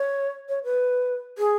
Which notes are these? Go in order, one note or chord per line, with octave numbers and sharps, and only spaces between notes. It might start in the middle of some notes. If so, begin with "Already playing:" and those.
Already playing: C#5
C#5
B4
G#4